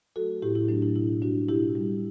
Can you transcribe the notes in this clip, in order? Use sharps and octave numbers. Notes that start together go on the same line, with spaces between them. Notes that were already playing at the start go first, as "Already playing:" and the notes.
F#3 A3 F#4 A4
A2 E4 G4
E4
F#3 A3 D4
E4
B2 E4
G3 D4 F#4
B2 E4 G4
G3